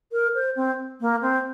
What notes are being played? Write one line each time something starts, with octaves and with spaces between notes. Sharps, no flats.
A#4
C5
C4
A#3
C4